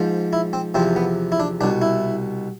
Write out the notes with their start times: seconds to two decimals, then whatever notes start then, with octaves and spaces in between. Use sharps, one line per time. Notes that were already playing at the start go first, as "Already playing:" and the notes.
Already playing: G#2 F3
0.33 E4
0.53 C4
0.74 E2 C3 F3 C4
0.96 B3
1.32 E4
1.40 D4
1.61 C2 B2 D4
1.82 E4